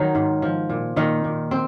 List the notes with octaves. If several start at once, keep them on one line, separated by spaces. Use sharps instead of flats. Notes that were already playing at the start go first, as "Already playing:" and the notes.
Already playing: D#3 F#3 D#4
G#2
F3
A#2
A#2 D#3 D#4
A#2
C4